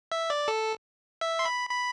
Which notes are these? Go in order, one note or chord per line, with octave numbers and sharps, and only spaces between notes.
E5
D5
A4
E5
C6
B5
B5